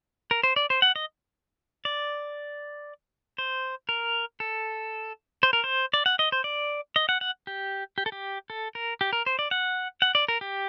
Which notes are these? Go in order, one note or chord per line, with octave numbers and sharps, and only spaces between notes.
A#4
C5
D5
C5
F#5
D#5
D5
C5
A#4
A4
C5
A#4
C5
D5
F#5
D#5
C5
D5
D#5
F#5
F#5
G4
G4
A4
G4
A4
A#4
G4
A#4
C5
D5
F#5
F#5
D5
A#4
G4